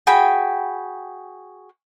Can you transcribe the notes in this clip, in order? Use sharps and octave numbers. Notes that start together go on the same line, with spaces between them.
F#4 G#4 G5 B5